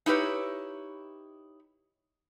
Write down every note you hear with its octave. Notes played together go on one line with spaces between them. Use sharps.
D#4 E4 G4 B4 C#5